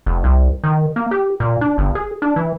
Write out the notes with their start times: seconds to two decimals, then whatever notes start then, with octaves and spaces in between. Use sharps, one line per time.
0.06 F1
0.24 C2
0.64 D#3
0.96 A#3
1.11 G4
1.40 A#2
1.61 D4
1.78 G1
1.95 G#4
2.22 D4
2.36 E3